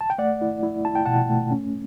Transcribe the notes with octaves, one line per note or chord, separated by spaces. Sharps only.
A5
G5
A3 D5 F#5
E4
E4
E4 A5
G5
B2 F#5 A5
A3
C#4